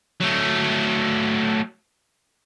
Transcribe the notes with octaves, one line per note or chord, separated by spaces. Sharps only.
F#3 A3